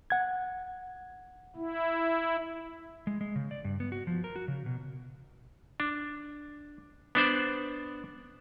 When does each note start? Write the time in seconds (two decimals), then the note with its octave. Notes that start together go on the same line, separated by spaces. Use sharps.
0.10 F#5 G#6
1.56 E4
3.07 G#3
3.21 G#3
3.36 C#3
3.51 D5
3.64 G2
3.80 B3
3.92 F#4
4.07 F3
4.24 A#4
4.36 F#4
4.48 C#3
4.66 B2
5.80 D4
7.15 B3 D4 C5 D5